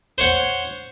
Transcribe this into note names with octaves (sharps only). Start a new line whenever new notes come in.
C5 C#5 F#5